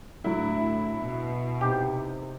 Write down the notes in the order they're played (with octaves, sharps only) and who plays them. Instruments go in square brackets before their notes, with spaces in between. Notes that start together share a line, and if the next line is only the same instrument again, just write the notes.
[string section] A2 [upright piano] D3 F#3 [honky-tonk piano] E4
[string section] B2
[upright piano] C3 D#4 [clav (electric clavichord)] G4